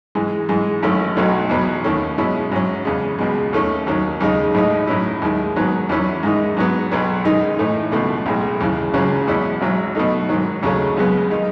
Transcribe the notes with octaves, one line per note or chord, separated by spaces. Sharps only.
G#2 E3 G#3
G#2 E3 G#3
G#1 F#2 D#3 A3 C#4
B1 B2 F#3 A3 D#4
E2 B2 F#3
D#2 D#3 A3 C#4
B2 G#3 C#4 E4
G#2 F#3 C#4
E2 C#3 G#3
C#2 B2 G#3
D#2 D#3 A3 C#4
D#2 D#3 F#3 C#4
D#2 C#3 G#3 D#4
A1 A2 G#3 D#4
A2 F#3 C#4 E4
D#2 D#3 G#3
G#2 D#3 F#3 B3
E2 D#3 F#3 C#4 E4
G#2 D#3 G#3 D#4
G#2 F#3 B3
B1 B2 F#3 B3
F#2 D#3 G#3 D#4
A2 E3 A3 D#4
C#2 B2 A3
B1 A2 G#3
D#2 C#3 E3
C#2 C#3 F#3 C#4
E2 B2 G#3 C#4 E4
G#1 G#2 F#3
B2 A3 D#4
G#2 D#3 F#3
D#2 C#3 F#3 A3 C#4
F#2 C#3 G#3 B3
D#3 G#3 D#4